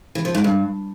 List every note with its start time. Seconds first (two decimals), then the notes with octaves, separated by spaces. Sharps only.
0.15 E3
0.25 F3
0.35 G#2
0.44 G2